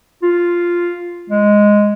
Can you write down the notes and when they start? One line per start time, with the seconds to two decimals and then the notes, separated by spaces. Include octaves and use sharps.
0.22 F4
1.30 G#3